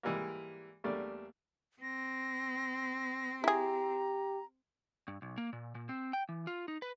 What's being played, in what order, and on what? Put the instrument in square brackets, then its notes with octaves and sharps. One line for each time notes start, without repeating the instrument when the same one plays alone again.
[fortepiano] G#2 E3 G3 G#3 A#3
E2 G3 A3 A#3 D4
[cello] C4 [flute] A#6
[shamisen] E4 G#4 [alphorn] G4 [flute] A#5
[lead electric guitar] G2
B1
A#3
A#2
A#2
C4
G5
E3
F4
D#4
B4